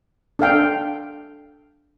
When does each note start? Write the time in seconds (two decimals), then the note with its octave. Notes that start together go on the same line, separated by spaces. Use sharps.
0.39 D4 A4 F5 G5